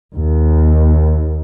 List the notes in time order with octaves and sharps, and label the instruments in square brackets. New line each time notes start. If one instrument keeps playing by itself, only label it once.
[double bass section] D#2